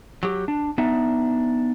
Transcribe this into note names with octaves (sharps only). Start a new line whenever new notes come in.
F#3 G4
D4
B3 D4 D#4 E5